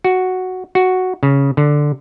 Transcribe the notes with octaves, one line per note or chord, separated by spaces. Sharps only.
F#4
F#4
C#3
D3